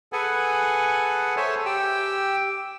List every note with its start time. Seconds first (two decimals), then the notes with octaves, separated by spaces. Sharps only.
0.13 G#4 A4 B4 F#5 G#5
1.37 A4 C5 C#5 E5 G#5 A5
1.65 G4 G5 E6